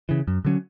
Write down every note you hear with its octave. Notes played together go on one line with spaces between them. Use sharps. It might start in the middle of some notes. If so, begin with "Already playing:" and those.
C#3 E3
F#2
D3 F#3 C#4